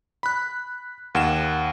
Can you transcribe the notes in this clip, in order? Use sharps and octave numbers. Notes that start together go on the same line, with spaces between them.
B5 F#6
D#2 F#5 E7